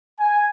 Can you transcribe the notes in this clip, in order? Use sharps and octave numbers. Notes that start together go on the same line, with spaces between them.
G#5